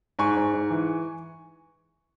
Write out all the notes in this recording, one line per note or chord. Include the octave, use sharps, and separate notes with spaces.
G#2 G#5 C#6
G#2
G#2
E3